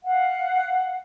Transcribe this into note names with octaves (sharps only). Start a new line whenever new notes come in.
F5 F#5